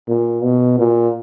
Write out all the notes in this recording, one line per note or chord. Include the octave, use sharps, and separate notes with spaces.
A#2
B2
A#2